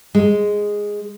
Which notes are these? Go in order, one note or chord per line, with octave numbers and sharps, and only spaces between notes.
G#3